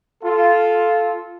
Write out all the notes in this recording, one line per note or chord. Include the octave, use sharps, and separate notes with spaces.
F4 A4